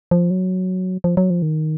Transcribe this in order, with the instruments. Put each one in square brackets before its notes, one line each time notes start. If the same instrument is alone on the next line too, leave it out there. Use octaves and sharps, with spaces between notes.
[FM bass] F3
F#3
F3
F#3
F3
D#3